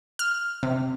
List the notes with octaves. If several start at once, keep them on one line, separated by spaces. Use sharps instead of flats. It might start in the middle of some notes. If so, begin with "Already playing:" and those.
F6
C3